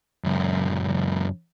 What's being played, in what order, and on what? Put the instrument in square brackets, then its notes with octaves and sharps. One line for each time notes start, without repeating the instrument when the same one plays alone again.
[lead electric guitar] C#2 F#2